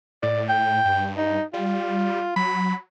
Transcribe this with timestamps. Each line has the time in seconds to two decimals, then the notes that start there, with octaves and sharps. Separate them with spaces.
0.23 A2 D5
0.49 G5
0.85 G2
1.17 D#4
1.53 G3 F4
2.36 F#3 B5